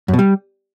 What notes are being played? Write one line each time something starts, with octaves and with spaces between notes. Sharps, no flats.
F#2
B2
G3